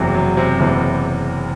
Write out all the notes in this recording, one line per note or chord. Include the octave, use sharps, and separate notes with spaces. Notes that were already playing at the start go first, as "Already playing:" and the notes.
Already playing: F#1 E2 C3 E3 F#3
F#3
C3 C4
F#1 E2 C3 E3